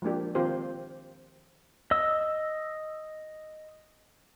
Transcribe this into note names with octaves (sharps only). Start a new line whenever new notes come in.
F3 G#3 A#3 D4 G4
D#3 C4 F4 G4 C5
D#5 E6